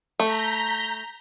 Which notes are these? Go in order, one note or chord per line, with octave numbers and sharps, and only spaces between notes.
A3 A#5 G6 B6